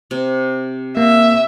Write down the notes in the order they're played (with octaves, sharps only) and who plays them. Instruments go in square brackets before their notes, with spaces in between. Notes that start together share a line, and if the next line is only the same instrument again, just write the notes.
[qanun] C3
[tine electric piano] A#3 [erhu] E5